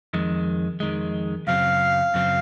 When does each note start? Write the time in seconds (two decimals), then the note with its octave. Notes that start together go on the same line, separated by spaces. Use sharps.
0.14 F2 D#3 G#3
0.80 F2 D#3 G#3
1.47 F#2 C#3 F#3 C4 F5
2.14 F#2 C#3 F#3 C4